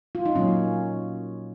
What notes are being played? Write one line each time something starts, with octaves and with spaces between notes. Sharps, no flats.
F4
D#4
A#2 F#3 A#3 C#4